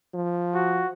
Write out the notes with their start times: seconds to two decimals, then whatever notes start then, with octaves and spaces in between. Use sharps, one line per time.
0.14 F3
0.54 F#4